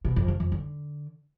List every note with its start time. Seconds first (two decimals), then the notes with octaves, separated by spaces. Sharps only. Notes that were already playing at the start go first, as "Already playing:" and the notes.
0.05 B2
0.16 F2
0.28 C#3
0.40 F2
0.52 D3